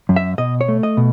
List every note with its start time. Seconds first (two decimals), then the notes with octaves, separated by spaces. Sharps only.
0.09 F#2
0.16 E5
0.38 B2 D#5
0.61 C#5
0.68 A3
0.83 D#5
0.97 B2